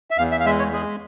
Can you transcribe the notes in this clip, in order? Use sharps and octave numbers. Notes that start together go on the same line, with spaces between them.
E5
E2 F5
E5
F5
G#3 E5
C#5
G#3 G#4